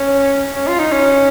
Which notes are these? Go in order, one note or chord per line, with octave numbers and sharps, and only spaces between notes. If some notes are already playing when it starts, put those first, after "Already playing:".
Already playing: C#4
C#4
F4
D#4
C#4